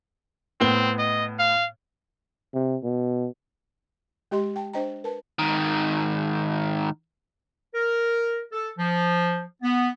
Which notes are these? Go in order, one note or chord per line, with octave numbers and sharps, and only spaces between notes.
A2 B3 C4 G7
D#5
F5
C3
B2
G#3 G4 D#5 C6
G5 A5
D4 C5 D#5 G5 A#5
A#4 B4 A5
G#2 D#3
A#4
A4
F3
B3